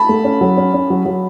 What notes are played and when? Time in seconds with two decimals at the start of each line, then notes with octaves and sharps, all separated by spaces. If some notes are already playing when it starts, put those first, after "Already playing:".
Already playing: A5 B5
0.09 A3
0.25 C#4
0.41 F#3
0.57 C#4
0.74 C#4
0.90 F#3
1.06 F#3